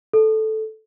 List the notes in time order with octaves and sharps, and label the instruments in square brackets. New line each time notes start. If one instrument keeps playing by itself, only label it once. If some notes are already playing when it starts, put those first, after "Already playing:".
[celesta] A4